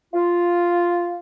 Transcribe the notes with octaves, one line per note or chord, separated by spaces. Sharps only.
F4